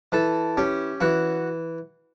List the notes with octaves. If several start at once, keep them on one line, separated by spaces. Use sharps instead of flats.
E3 A4
C#4 G4
E3 F#4